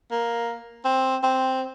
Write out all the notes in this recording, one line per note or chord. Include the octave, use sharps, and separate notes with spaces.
A#3
C4
C4